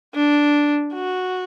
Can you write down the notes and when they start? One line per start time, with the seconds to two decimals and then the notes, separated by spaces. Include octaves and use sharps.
0.15 D4
0.95 F#4